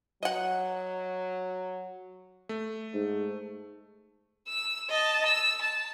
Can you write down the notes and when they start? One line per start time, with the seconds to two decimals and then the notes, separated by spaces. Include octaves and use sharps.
0.23 F#3 D#5 F#5
2.49 A3
2.94 G#2
4.48 E6
4.89 D#5 A5
5.26 E6
5.62 A5